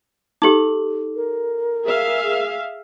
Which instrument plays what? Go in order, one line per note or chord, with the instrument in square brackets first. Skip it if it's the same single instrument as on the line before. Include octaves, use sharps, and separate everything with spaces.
[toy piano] D#4 G4 [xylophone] A4 D6
[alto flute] A#4
[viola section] G#4 E5 F5